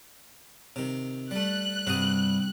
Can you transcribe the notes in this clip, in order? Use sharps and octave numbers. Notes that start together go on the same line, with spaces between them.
C3 D#3
G3 A3 F#6
G2 C3 F#4 D#6